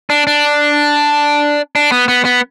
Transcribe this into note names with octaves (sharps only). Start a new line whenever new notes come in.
D4
D4
D4
B3
B3
B3